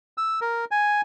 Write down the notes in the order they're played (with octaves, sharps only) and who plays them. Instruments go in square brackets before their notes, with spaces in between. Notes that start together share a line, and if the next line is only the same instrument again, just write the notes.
[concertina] E6
A#4
G#5